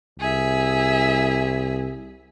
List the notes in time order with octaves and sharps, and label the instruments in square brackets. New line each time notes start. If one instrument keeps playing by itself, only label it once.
[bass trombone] C2 [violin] G#4 E5